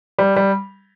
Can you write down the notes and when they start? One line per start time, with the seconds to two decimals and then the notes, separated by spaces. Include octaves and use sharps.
0.19 G3
0.36 G3